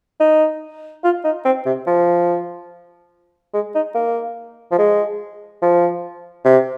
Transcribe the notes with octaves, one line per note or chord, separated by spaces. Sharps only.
D#4
F4
D#4
C4
C3
F3
G#3
D#4
A#3
F3
G#3
F3
C3